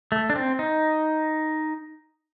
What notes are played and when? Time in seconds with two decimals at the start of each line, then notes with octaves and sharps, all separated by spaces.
0.12 A3
0.30 D4
0.36 C4
0.59 D#4